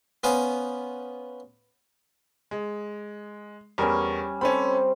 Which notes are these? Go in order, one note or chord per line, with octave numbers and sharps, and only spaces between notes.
B3 C#4 C5 F5 G#5
G#3
E2 G3 C#4 A#4
C4 C#4 A4 B5